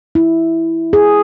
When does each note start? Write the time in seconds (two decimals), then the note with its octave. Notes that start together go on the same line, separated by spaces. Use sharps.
0.15 E4
0.93 G#4